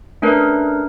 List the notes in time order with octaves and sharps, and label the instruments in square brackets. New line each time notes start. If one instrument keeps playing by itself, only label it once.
[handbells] A3 C#4 D4 A#4 B4